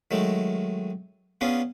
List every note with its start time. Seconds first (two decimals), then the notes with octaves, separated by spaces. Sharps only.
0.11 D#3 F#3 G#3 A3
1.41 B3 C#4 D4 F4 G#4